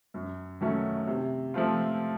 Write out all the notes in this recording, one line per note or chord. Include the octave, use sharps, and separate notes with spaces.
F#2
D#3 F#3 A3 C#4
C3
F3 A3 C4 F4